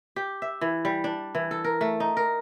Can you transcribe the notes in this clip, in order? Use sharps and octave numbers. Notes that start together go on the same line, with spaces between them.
G4
E5
E3
G3
D4
E3
A4
A#4
A3
D#4
A#4